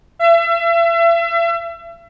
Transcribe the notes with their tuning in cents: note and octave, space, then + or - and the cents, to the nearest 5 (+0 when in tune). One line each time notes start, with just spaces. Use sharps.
E5 +35